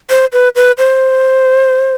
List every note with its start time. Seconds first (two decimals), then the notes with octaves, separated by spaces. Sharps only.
0.10 C5
0.33 B4
0.56 B4
0.78 C5